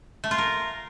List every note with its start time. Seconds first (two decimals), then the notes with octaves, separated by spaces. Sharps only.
0.24 A3
0.31 F4
0.38 A#4